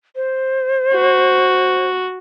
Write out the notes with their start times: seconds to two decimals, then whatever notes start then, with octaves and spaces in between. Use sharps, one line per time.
0.16 C5
0.94 F#4